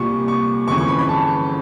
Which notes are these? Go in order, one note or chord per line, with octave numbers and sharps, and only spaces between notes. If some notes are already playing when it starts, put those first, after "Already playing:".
Already playing: C2 A#2 G3 C#6
C#6
G1 F2 C#3 E3 C#6
C#6
B5
B5
A5